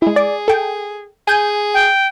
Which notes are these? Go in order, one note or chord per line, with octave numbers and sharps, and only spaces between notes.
G#3 E4 G#4
D5
A4 G5
G#4 G#5 G6 D#7
G5